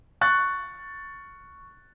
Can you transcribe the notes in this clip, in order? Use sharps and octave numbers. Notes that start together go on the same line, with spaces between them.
C#6 F#6 A6